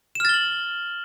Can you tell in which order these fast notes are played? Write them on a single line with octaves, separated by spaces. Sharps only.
E7 F6 A6 G7 F#7